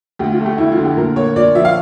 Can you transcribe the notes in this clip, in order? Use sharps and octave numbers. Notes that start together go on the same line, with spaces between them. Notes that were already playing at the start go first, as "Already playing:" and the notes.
D2 G4
F4
A3
G4
D2 E4
F4
D3
G4
A#2 A#4
A#3 C#5
A#2 D5
F3 E5
F5